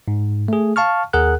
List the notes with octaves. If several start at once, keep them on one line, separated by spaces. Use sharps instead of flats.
G#2
A3 G#4
F5 A5 C#6 F6
D#2 G#4 A#4 F#5 F#6